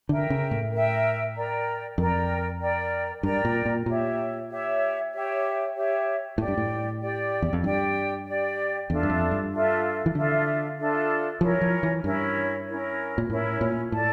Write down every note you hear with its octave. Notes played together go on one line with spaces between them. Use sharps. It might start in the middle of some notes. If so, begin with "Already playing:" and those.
D3 A#4 E5 G5
C#3
A2
A#4 E5 G5
A#4 D5 G5 A#5
F2 A#4 D5 G5 A#5
A#4 D5 G5 A#5
G2 A#4 D5 G5 A#5
A#2
A#2
A#2 G4 C#5 E5
G4 C#5 E5
G4 C#5 E5
G4 C#5 E5
A2 G4 D5 G5
G2
A2
G4 D5 G5
E2
F2
G2 G4 D5 G5
G4 D5 G5
E2 D4 F4 A4 E5
G2
F2
G2
D4 F4 A4 E5
E3
D3 D4 F4 A4 E5
D4 F4 A4 E5
F3 C#4 E4 A#4 C#5
F3
E3
G2 C#4 E4 A#4 C#5
C#4 E4 A#4 C#5
A#2
A2 C#4 E4 A#4 C#5
A#2
A2 A4 D5 A5